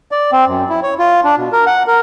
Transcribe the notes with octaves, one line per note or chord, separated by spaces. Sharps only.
D5
C4
F#2
E4
C#5
F4
D4
B2
A#4
F#5
A#4